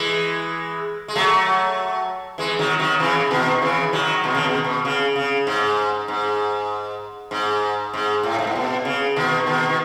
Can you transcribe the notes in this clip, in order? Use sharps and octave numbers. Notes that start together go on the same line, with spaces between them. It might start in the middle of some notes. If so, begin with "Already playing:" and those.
Already playing: E3 G#3
G#3
F#3 A3
E3 G#3
D#3 F#3
D#3 F#3
C#3 E3
E3
B2 D#3
C#3 E3
D#3 F#3
B2 D#3
C#3
B2 D#3
B2
C#3
C#3
G#2
G#2
G#2
G#2
A2
G#2
A2
B2
C#3
B2 D#3
B2 D#3
D#3